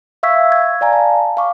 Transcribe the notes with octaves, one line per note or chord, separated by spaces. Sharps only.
E5 F5 C#6 E6 G#6 B6
G#6
D5 F5 G#5 A#5
A5
F5 C#6 D6